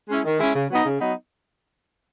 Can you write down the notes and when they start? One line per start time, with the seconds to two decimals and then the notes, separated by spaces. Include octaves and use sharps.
0.09 G#3 C#4 E4
0.25 D#3
0.39 G#3 C#4 E4
0.55 C#3
0.70 F#3 B3 D#4
0.85 C#3
1.00 F#3 B3 D#4